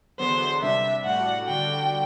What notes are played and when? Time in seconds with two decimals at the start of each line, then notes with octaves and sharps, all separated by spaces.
0.19 E2 D3 F#3 B3 C5
0.62 C3 G3 D4 E5
1.05 A2 G3 D4 F#4 F#5
1.48 D3 G3 D4 F#4 G5